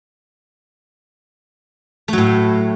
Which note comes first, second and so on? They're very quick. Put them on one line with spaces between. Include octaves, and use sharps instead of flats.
A3 F#3 A2